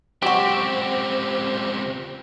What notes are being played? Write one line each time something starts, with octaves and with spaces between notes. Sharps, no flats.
C#2 F#3 C4 F#4 G4